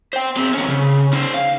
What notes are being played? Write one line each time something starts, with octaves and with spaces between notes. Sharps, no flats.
C5 G5
C4 G#4
D#2 C#4
C#3
C#4 C5
F5